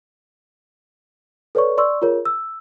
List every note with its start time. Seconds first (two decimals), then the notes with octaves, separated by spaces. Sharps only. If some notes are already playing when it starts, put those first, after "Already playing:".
1.55 A4 B4 C#5 D5 C#6
1.78 D5 C6 C#6 E6
2.02 F4 G#4 A#4 C#5
2.25 E6